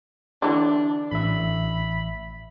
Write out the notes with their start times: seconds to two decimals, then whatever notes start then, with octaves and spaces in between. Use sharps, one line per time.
0.42 D3 E3 D4
1.12 A1 E5 B5